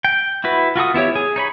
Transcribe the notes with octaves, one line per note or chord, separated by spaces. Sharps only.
G5
E4 F#4 B4
F4 F#4 A4 D#6
B3 E4 G4 C#5
G#4
D#4 C#5 B5